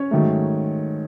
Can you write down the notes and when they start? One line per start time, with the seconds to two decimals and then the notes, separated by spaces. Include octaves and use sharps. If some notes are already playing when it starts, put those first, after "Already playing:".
Already playing: C#4 C#5
0.11 G#2 D#3 F#3 A3